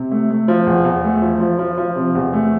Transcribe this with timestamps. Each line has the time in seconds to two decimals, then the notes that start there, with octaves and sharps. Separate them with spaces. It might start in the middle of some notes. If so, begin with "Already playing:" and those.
Already playing: C3
0.11 A3
0.30 A3
0.48 F3
0.67 E2
0.85 E2
1.04 A3
1.22 F3
1.40 F3
1.59 F3
1.78 F3
1.96 C3
2.15 E2
2.33 A3